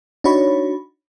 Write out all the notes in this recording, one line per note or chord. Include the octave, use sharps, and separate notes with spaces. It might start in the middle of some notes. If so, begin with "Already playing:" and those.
D4 D#4 F#4 C#5 B5